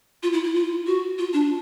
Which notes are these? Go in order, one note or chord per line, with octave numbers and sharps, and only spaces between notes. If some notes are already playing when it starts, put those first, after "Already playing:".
F4
E4
E4
F4
F#4
F4
D4